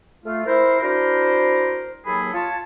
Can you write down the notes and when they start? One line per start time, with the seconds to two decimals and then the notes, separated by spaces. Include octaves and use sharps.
0.25 A3 F4
0.46 E4 A#4 C5
0.81 D4 E4 F#4 A#4 C5
2.05 D#2 F#3 A#3 G#4 A4 B5
2.33 F4 C#5 A5